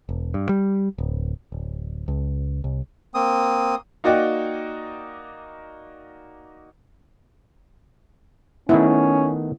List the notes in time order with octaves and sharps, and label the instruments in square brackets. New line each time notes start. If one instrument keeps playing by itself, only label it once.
[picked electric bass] E1
G2
G3
D1
D1
C#2
C2
[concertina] A#3 C4 D#6
[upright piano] A#3 D#4 F#4 D5 D#5 G5
[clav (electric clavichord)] D#3 A3 B3 [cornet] C#4 [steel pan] E4